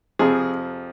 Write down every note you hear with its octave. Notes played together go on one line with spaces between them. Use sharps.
F2 C3 F3 G#4